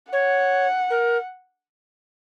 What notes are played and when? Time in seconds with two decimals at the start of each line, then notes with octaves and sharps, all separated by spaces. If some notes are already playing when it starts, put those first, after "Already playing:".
0.11 C#5 F#5
0.90 A#4